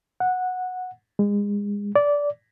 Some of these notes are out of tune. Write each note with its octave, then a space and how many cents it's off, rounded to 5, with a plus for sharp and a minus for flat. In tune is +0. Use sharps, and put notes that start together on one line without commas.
F#5 -10
G#3 -30
D5 -15